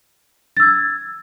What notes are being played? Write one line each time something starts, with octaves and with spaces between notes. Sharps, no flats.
E6 G#6 A6